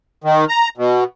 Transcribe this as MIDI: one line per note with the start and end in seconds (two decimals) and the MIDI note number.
0.24 0.45 51
0.49 0.69 82
0.77 1.04 47